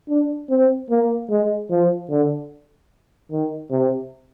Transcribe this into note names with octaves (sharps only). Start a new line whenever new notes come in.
D4
C4
A#3
G#3
F3
D3
D#3
C3